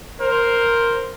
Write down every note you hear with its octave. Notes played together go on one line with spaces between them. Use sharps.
A#4 C5